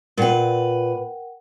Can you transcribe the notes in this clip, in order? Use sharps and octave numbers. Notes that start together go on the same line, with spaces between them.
A#2 A#4 B4 F#5 G5